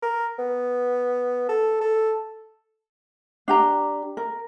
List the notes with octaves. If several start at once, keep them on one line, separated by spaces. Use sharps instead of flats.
A#4
B3
A4
A4
D4 G4 A#5
A#4